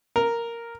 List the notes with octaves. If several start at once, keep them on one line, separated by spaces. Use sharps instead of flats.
A#4